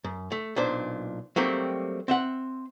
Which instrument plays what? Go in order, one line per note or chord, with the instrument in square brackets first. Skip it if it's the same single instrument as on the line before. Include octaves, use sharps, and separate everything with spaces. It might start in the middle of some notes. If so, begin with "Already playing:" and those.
[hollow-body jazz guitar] F#2
A3
B1 A#2 D4 C5
F#3 G3 A3 A#3 C4 G4
C4 E5 F#5